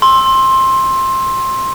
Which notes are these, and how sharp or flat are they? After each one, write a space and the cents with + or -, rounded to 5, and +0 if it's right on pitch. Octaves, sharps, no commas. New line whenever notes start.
C6 +15 E6 -5